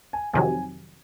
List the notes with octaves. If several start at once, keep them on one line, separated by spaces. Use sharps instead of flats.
G#5
F2 C3 D#3 F#3 G#5